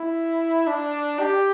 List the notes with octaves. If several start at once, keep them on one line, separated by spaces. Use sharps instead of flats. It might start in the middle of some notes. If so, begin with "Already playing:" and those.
Already playing: E4
D4
G4